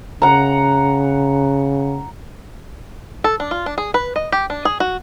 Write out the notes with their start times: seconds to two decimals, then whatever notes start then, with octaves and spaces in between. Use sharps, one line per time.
0.22 C#3 F#5 A#5
3.24 A4
3.40 D4
3.51 F4
3.66 D4
3.78 G#4
3.94 B4
4.16 D#5
4.32 G4
4.50 D4
4.65 G#4
4.80 F#4